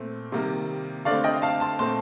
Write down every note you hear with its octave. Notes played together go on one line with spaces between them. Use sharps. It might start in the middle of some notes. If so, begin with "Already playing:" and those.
Already playing: A#2 A3 C4
C3 D#3 G3 A#3
D3 A3 C4 D5 F5
D#5 G5
F5 A5
A5 C6
A#2 A3 C4 A5 C6